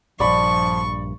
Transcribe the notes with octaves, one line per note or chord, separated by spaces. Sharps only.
A#1 G2 F3 D5 B5 C#6